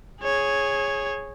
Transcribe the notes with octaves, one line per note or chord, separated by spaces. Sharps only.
G#4 C#5